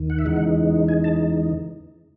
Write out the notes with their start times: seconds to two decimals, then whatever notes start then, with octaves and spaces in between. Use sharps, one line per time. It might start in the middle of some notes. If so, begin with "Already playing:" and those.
Already playing: D#2 D#3
0.10 F#5
0.19 E5
0.25 E2 C#3 E3 G#3 D#4 F#5
0.88 G#5
1.04 A5